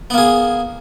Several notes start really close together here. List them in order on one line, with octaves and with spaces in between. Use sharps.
B3 A#3 G#4